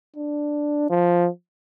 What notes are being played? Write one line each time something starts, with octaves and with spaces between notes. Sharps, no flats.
D4
F3